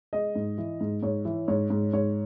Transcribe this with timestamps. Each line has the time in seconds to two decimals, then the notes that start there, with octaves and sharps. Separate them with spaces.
0.13 G#3 D#5
0.35 G#2
0.58 E3
0.81 G#2
1.03 G#2 C#5
1.25 E3
1.48 G#2 C#5
1.70 G#2
1.93 G#2 C#5